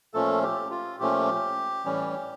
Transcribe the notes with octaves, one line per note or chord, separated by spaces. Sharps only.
A#2 F3 A3 C#4 A4
G4
F4
A#2 F3 A3 C#4 G4
A2 E3 G3 C#4